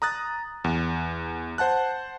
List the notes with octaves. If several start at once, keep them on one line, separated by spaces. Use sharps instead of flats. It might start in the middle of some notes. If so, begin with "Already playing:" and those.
A#5 D#6 F#6 A6
E2
C5 F#5 A5 F#6